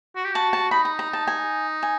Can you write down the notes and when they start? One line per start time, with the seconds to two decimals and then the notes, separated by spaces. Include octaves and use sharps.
0.16 F#4
0.25 G4
0.35 F#4 A5
0.53 A5
0.71 D#4 B5
0.85 A#5
0.99 A#5
1.13 A5
1.27 G#5
1.83 G#5